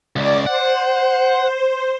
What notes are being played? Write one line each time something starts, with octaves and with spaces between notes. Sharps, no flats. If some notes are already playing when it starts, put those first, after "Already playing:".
C#2 C#3 D5
C5 F#5